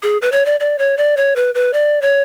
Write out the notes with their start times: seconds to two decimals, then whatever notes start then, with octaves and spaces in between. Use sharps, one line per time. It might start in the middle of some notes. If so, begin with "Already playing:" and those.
0.03 G#4
0.22 B4
0.32 C#5
0.46 D5
0.60 D5
0.78 C#5
0.97 D5
1.17 C#5
1.36 B4
1.55 B4
1.73 D5
2.02 C#5